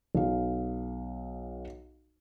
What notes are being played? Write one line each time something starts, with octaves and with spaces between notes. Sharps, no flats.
B1 F5